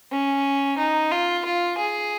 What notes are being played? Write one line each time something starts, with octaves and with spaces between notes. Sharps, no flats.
C#4
D#4
F4
F4
G#4